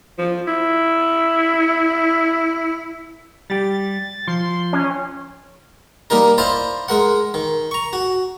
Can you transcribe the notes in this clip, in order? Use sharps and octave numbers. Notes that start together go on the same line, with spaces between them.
F3
E4
G3 G4 A6
F3 C6
C#4
G3 A#3 D#4 A#4
E4 C5 D5 D#5 F5
G#3 A#4 F#5
D#3
A#5 C#6
F#4